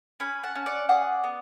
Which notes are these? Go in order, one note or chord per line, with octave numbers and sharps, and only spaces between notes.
C#4 G#5 B5
F#5 A5
C#4
D5 F#5
G#4 D5 F#5
B3